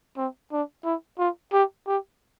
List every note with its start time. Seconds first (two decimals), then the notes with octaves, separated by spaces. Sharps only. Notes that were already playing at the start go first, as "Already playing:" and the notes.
0.17 C4
0.52 D4
0.85 E4
1.19 F4
1.53 G4
1.87 G4